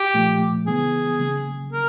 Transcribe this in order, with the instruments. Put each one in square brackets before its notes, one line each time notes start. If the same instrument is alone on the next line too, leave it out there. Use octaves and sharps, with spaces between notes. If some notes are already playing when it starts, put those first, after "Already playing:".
Already playing: [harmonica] G4
[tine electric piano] A#2 F3 A3
[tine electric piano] C#3 E3 G#3 B3 [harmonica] G#4
[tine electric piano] C#3 F#3 A#3
[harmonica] A#4